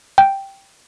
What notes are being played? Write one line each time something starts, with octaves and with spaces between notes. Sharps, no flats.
G5